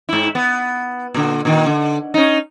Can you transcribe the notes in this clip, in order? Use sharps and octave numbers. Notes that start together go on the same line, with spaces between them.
G#2 E4
B3
A#2 D3
A#2 D#3
D3
C#4 D#4